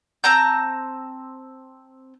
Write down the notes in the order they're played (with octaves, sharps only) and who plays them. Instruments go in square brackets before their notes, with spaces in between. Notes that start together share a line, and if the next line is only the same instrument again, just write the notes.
[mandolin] C4 A5 A#5 G6